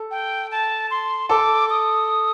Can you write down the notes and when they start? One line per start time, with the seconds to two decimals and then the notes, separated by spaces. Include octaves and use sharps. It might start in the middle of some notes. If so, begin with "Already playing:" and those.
Already playing: A4
0.11 G5
0.51 A5
0.91 C6
1.29 A4 D6
1.70 D#6